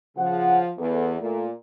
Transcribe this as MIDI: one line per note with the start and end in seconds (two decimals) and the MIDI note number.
0.17 0.60 49
0.17 0.70 53
0.17 0.60 78
0.79 1.19 40
0.79 1.11 59
0.79 1.11 69
1.20 1.50 46
1.20 1.45 57